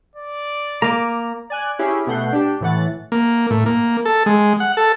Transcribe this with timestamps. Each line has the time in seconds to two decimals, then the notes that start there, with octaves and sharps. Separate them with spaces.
0.16 D5
0.82 A#3 A#5 D6
1.50 D5 G#5 F#6
1.79 C#4 E4 G4 G#4
2.07 B2 A3 F#5 G6 C7
2.32 D4 G4
2.61 A2 E3 A3 F#5 A6
3.12 A#3
3.50 A2
3.66 A#3
4.05 A4
4.26 G#3
4.60 F#5
4.77 A4